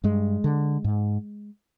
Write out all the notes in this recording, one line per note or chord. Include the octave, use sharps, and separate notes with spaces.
G2 G#3
D3
G#2